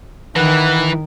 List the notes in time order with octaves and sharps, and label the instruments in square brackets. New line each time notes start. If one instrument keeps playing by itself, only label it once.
[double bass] D#3 [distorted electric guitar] E3 [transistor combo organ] B4 [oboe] F#5